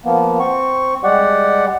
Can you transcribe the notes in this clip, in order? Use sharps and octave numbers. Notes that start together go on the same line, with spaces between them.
F3 A#3 B3
C4 C#6
G3 G#3 G4 D5 F#5